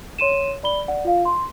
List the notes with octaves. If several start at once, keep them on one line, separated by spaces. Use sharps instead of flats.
C#5 C6 D#7 E7
D5 B5 G7
D5 F#5
F4 F5
C6